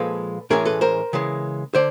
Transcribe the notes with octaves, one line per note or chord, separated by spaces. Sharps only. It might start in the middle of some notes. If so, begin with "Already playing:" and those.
Already playing: A#2 F3 G#3 A4 B4
A2 E3 G#3 C#4 G#4 A#4
A4 B4
A#4 C5
C#3 E3 G#3
D3 C5 D5